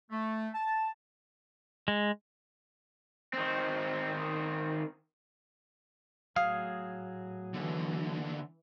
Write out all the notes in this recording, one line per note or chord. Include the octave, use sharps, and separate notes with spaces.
A3
A5
G#3
D#3 C4
A2 F#3 G#4 F5 D#6
D#2 D3 E3